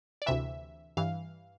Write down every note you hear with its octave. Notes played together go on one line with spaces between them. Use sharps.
D5
D2 C3 E3 E5
G2 E3 F5